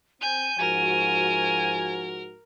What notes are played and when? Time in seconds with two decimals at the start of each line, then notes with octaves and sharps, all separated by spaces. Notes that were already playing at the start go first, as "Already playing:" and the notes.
0.22 C4 G#5 G6 D#7
0.59 G#2 F3 F#4 A#4 G#5